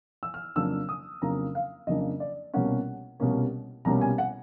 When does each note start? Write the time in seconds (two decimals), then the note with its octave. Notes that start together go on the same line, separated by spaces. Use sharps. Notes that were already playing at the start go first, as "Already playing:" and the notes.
0.23 E6
0.34 F6
0.56 F2 C#3 F#3 A#3 D4 E6
0.89 D#6
1.22 F2 C#3 F#3 A#3 D4 A#5
1.55 F5
1.87 F2 C#3 F#3 A#3 D4 D#5
2.20 D5
2.54 C2 B2 G3 A#3 C#4 F#5
3.20 C2 B2 G3 A#3 C#4
3.85 C2 B2 G3 A#3 C#4 A#5
4.01 G#5
4.18 F#5